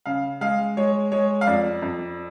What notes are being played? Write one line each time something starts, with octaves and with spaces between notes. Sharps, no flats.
C#3 F5
G#3 F5
G#3 C#5
G#3 C#5
F5
F2 D5
F2